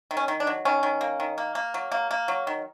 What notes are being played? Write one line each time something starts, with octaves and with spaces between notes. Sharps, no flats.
D#3
C#4
D#3
D4
F#3
D#3 C#4
D#3
A#3
D#3
A#3
A#3
F#3
A#3
A#3
F#3
D#3